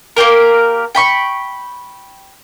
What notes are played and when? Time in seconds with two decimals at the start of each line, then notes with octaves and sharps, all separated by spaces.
0.16 A#3 C4 G4 A#4
0.95 G5 B5 C#6